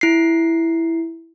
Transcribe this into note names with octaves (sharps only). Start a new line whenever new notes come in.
E4 C7